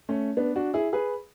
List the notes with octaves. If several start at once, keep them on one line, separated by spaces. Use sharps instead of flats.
A3 C#4
B3 D4
D4 F#4
E4 G#4
G#4 B4